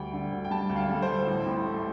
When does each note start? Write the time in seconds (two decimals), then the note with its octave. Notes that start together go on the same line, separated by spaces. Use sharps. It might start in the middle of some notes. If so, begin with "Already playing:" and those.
Already playing: D2 G3 G5
0.13 D3
0.32 D2
0.45 G5
0.51 G3 A5
0.70 D2
0.76 F5
0.89 G3
0.94 A4
1.02 C5
1.09 D2
1.27 A1
1.46 A2
1.66 A3